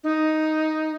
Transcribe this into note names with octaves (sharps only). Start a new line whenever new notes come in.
D#4